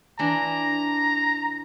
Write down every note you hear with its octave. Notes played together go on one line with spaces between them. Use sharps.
E3 D4 A#5